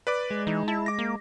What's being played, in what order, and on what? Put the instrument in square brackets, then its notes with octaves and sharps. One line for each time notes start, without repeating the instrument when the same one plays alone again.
[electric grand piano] B4 D5 D6
[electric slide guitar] G#3
[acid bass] E3 [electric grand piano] D#4
[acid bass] E4 [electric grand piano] A5
[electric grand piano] D6 A#6
[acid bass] A#3